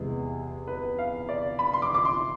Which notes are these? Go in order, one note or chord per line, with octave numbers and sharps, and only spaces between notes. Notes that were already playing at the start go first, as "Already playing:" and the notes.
Already playing: E2 C3 G#3 B3 G#4
B4
F5
D5
B5
C6
D6
D6
C6